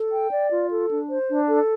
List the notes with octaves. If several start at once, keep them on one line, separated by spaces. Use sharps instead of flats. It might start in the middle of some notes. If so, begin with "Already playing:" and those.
Already playing: A4
G5
D5
F4
A4
D4
C5
D4
A4